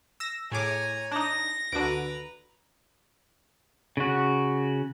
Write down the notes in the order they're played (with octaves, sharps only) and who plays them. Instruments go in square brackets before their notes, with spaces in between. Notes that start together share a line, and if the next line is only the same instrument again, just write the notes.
[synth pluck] E6 A#6
[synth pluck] A2 G#4 D6 [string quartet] C#5 G#5 A#5
[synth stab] D4 D#4 [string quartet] A#6
[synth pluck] D2 F#4 [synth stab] D3 D7 [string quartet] B4 A#5
[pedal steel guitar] C#3 F#4